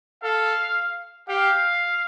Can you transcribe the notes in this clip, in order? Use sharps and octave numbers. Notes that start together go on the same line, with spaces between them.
A4 F5
G4 F5